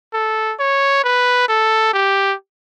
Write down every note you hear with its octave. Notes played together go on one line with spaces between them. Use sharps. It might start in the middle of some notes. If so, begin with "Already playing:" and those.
A4
C#5
B4
A4
G4